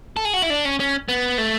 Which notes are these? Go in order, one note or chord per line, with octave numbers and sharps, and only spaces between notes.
A4
G#4
F#4
E4
D4
C#4
C#4
B3
A3